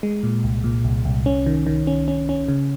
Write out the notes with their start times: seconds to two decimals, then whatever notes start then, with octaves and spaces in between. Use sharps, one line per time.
0.03 G#3
0.23 A#2
0.44 C2
0.64 A#2
0.84 C2
1.05 C2
1.26 C#4
1.46 D#3
1.67 D#3
1.87 C#4
2.08 C#4
2.29 C#4
2.48 C#3